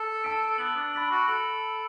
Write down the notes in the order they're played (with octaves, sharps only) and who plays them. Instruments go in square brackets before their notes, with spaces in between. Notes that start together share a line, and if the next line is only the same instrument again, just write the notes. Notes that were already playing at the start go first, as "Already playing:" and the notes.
Already playing: [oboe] A4
[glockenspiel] A5 E6 B6 D7
[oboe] B3 [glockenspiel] F#6 A6 F#7
[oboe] D4
[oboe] D4 [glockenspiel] B5 F#6 B6 D7 F#7
[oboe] F#4
[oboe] A4 [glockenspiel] F#6 D7 F#7